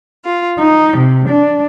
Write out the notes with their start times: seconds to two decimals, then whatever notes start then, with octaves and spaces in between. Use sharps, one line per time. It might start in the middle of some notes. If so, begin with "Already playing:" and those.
0.25 F4
0.58 D#4
0.96 C3
1.29 D4